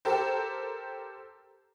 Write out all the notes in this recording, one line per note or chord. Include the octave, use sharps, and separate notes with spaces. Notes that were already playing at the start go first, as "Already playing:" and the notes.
G4 A4 A#4 C5